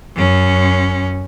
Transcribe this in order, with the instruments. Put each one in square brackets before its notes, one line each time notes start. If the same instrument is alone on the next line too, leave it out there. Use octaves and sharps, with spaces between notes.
[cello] F#2 C#4